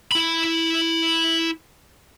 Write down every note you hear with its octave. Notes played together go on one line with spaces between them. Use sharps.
E4 B5